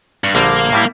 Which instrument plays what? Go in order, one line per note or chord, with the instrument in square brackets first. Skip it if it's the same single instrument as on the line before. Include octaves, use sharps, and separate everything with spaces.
[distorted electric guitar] G2
[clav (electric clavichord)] A#1 D3 G3 [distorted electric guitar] A#3
[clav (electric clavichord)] A2 G3 E4